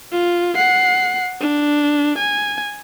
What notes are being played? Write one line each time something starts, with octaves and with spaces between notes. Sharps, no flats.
F4
F#5 C7
D4
G#5